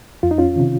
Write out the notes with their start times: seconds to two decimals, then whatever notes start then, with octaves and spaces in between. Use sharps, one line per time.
0.23 F2 F4
0.31 D#4
0.38 C#4 F4
0.56 C3 D#3